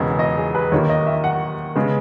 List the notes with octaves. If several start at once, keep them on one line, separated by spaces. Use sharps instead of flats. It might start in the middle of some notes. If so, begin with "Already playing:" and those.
Already playing: E1 E2 C#3 G#3 B3
D#5
G#4
B4
D#2 D#3 A#3 C#5
D#5
E5
F#5
C#3 G#3 B3